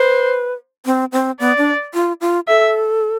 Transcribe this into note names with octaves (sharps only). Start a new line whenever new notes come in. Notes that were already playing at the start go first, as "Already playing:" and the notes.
Already playing: B4 C5
C4
C4
B3 D5
D4
F4
F4
A4 E5